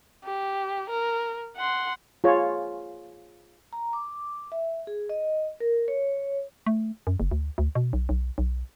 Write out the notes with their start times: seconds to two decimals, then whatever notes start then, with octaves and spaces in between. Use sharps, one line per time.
0.24 G4
0.90 A#4
1.56 F#5 C6
2.24 F4 G#4 C#5
3.73 A#5
3.93 D6
4.52 E5
4.87 G#4
5.09 D#5
5.60 A#4
5.88 C#5
6.66 A3
7.07 F#2
7.20 F#1
7.31 D2
7.58 D2
7.75 B2
7.93 B1
8.09 B1
8.38 B1